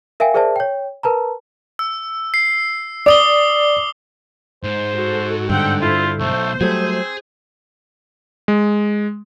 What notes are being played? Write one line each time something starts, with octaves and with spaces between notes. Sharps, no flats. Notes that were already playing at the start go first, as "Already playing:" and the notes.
A#4 E5 F5 G5 G#5
G#4 A#4 C5 D5 E5 A5
C#5 G5
A#4 B4 A5 A#5
E6
C7
D5 D6 D#6 G7
G#2 C5
F#4 A4
G2 D3 C4 F#5 G5
E4 F4 A4 C5
B1 A3 C5
F#3 G3 A3 C4 G#4
G#3